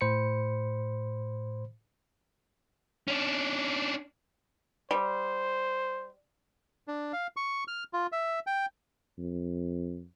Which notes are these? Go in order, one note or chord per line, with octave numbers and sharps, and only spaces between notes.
A2 C5 B5 C#7
C#4 D4
G3 C5
D4
F5
C#6
F6
F4
E5
G5
F2